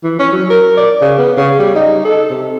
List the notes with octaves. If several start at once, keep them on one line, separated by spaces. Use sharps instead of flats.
E3
C#4
F#3
A#4
D5
C#3
B3
C#3
G3
D#4
A4
C3